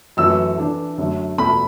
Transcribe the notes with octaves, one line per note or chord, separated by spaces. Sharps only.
F#2 E3 A3 E6
E3 D4 A4
F#2 D3 F#3 A3
E2 B2 A3 E4 A4 B5